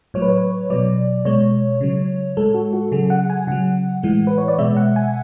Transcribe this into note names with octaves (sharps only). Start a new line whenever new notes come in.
A2 F#3 C#5
B4
C#5
B2 F#3 D5
B2 G#3 C#5
C#3 F#3
A2 G#3 A4
F#4
F#4
C#3 F#3 G#4
F#5
G#5
C#3 F#3 F#5
A2 E3 G#3
B4
C#5
D5
B2 G#3 E5
F#5
G#5